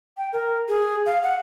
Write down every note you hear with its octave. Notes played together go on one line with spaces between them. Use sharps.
G5
A#4
G#4
F5
F#5